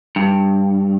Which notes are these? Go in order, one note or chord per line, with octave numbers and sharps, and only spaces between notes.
G2